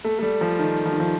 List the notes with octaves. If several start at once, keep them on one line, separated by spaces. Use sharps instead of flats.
A3
A3
G3
F3
D#3
F3
D#3
F3